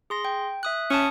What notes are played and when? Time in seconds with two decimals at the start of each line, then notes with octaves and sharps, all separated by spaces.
0.10 G#4 C6 A#6
0.25 G5
0.63 E5 D#6 F#6
0.90 C#4 A5 D#6 C#7